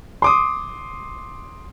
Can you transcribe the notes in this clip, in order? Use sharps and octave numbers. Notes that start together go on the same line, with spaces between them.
C6 D6 D#6